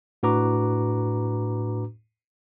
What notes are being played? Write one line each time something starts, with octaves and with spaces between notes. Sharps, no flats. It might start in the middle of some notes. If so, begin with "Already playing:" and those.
A2 D4 F#4 B4 A#5 D6